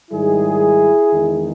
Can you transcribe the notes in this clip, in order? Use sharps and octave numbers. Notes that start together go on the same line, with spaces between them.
G#2 D#3 G3 E4 G#4
E2 D#3 G#3